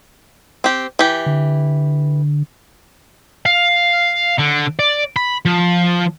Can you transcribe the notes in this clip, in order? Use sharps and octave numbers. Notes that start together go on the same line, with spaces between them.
C4 G4
E3 G4
D3
F5
D3
D5
B5
F3